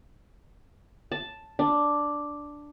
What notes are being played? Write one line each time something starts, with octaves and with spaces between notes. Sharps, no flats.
A5
D4